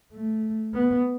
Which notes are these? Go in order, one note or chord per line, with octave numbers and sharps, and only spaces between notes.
A3
B3